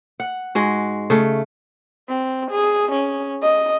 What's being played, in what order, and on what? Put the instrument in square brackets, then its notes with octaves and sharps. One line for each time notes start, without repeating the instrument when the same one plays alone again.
[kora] F#5
G#2 G#3 F#4
C#3 A3
[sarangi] C4
G#4
C#4
D#5